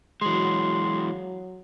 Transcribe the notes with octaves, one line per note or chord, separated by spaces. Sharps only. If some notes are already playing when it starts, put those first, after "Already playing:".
E3 F#3 G#3 C6